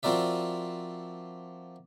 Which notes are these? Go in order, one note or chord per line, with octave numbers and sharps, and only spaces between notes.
F3 C4 F#4 A#4 D5 E5